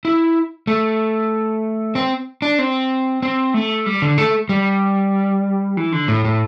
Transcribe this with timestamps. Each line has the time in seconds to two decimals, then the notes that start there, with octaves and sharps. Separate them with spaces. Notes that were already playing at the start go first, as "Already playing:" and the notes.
0.05 E4
0.67 A3
1.95 C4
2.42 D4
2.59 C4
3.22 C4
3.54 A3
3.86 G3
4.02 D3
4.18 A3
4.49 G3
5.77 E3
5.92 D3
6.08 A2
6.25 A2